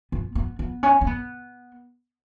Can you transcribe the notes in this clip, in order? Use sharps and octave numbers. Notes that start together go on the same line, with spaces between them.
B3
B3
B3
C#4
C#4
B3